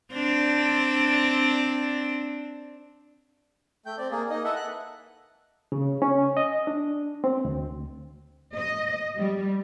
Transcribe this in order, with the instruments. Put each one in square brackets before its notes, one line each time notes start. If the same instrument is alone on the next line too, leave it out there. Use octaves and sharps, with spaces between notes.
[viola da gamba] C4 D4
[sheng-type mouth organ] A3 G5 G6
C4 D5
A#3 G#4
A#3 D#4 D#5
E4 A4 B4 D#5 E5 F#5
F#6
[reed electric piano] C#3
C#4
D#5
D4
C4
D2
[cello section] D#5
G3